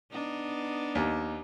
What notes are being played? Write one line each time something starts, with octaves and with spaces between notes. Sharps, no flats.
B3 D4 D#4
D#2